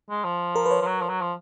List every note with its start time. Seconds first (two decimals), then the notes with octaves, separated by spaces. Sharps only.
0.10 G#3
0.24 F3
0.56 A#4
0.66 B4
0.71 C#5
0.81 F3
0.86 F#3
1.01 F3
1.09 F#3
1.21 F3